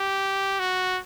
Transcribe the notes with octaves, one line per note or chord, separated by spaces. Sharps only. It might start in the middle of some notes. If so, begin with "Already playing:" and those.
Already playing: G4
F#4